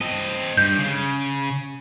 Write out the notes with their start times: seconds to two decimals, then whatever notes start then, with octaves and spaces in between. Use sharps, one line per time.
0.01 C4 D#5
0.57 G2 G6
0.78 C#3